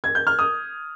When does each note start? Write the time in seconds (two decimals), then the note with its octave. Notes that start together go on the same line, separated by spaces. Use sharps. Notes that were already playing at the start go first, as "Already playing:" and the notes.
0.04 G#6
0.15 G6
0.27 F6
0.39 D#6